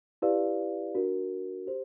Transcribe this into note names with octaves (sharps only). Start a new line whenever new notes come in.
E4 G4 B4 D5 F5
D4 F#4 A#4
G4 C5